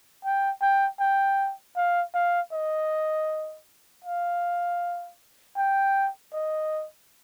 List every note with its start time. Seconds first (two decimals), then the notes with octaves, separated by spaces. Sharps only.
0.25 G5
0.62 G5
1.00 G5
1.76 F5
2.14 F5
2.52 D#5
4.04 F5
5.57 G5
6.33 D#5